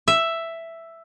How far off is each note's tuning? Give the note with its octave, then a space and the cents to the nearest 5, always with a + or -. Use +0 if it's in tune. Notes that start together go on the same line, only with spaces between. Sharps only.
E5 +5